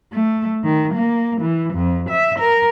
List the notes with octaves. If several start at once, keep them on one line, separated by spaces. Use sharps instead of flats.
A3
D#3
A#3
E3
F2
E5
A#4